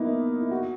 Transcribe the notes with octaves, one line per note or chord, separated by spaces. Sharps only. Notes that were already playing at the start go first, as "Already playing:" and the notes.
Already playing: A#3 B3 D#4 E4
E4
F#4